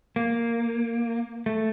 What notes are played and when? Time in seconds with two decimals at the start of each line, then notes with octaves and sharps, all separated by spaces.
0.16 A#3
1.46 A3